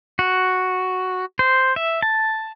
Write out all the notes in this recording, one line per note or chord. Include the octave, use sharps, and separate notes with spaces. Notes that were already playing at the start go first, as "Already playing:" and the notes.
F#4
C5
E5
A5